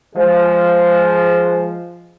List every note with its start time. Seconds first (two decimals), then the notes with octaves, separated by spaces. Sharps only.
0.15 F3 G#3